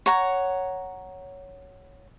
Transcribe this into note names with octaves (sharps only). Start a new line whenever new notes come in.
C#5 F#5 A#5